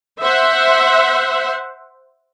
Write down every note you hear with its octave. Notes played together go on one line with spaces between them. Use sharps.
C5 E5 F#5